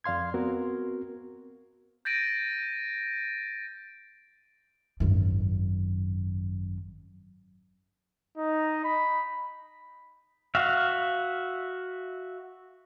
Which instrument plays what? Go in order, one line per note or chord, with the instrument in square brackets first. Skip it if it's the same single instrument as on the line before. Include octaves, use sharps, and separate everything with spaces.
[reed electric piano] F2 D5 F5 C6 G#6
B3 C4 F#4 A#4
[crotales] G6 A6 A#6 D7 D#7
[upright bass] G#1 F#2
[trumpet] D#4
B5
[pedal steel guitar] F#4 E5 F5